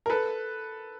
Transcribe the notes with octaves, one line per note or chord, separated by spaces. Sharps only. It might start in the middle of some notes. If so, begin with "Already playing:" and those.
A#4
A4 B4